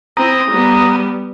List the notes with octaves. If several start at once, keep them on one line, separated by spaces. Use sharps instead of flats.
C4 E4 A#5 D#6
G3 B3